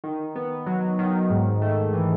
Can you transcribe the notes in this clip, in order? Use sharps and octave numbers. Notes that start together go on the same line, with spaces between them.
D#3
B3
F#3
D#3
G#2
A3
E3